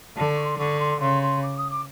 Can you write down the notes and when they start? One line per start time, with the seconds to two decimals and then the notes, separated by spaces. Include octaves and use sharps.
0.17 D3 A5
0.35 C#6
0.44 C6
0.58 D3 C#6
0.80 C6
1.00 C#3 C6
1.22 C6
1.43 D6
1.57 D#6
1.71 D6